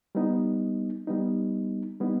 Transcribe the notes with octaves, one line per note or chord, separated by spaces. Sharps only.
G3 B3 D#4
G3 B3 D#4
G3 B3 D#4